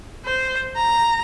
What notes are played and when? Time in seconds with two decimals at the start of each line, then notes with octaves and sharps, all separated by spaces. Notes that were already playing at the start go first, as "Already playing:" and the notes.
0.25 C5
0.76 A#5